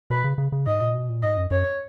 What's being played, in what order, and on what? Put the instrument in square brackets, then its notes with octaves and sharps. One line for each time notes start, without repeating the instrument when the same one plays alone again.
[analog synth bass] B2 [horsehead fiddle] B4
[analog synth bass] C#3
C#3
C#3
[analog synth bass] G#2 [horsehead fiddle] D#5
[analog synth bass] A#2
B2
A#2
[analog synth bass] G#2 [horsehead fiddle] D#5
[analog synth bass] F#2
[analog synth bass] F#2 [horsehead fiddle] C#5